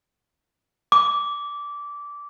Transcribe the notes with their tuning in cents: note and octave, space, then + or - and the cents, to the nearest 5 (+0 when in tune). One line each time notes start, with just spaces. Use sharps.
D6 -15